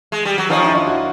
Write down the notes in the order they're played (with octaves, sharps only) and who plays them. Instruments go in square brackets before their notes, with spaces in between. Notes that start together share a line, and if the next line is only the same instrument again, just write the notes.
[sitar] G#3
G3
F#3
[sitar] D#3 F3 [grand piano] C#4 D#4
[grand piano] D4 E4
D#4 F4
E4 F#4